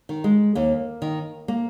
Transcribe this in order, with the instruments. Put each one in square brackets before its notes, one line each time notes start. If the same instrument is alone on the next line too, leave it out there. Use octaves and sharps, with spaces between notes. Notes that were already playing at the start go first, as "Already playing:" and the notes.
[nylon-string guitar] D#3
G#3
D#2 A#3
D#3
A#3